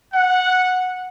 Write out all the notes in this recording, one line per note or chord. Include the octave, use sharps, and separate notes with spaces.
F#5